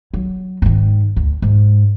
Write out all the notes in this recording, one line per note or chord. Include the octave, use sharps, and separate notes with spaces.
F#3
G#2 D#3
D2
G#2